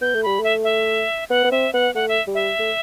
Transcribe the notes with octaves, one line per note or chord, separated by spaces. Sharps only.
B3 G6
A3
G3 B5
A3 E5
E5
B3 F#5
B3
C4 E5
B3 F#5
A3 F#5
E5
G3
E5
A3